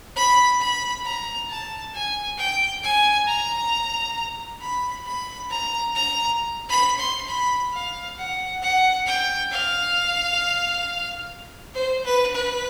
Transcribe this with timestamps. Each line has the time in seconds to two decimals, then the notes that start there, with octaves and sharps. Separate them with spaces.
0.16 B5
0.60 B5
1.05 A#5
1.49 A5
1.94 G#5
2.39 G5
2.84 G#5
3.28 A#5
4.62 B5
5.06 B5
5.50 A#5
5.95 A#5
6.69 B5
6.99 C6
7.29 B5
7.73 F5
8.18 F#5
8.63 F#5
9.07 G5
9.51 F5
11.74 C5
12.05 B4
12.34 B4